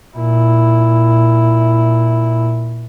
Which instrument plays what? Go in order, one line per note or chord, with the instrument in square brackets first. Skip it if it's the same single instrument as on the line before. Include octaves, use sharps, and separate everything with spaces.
[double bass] A#2 E4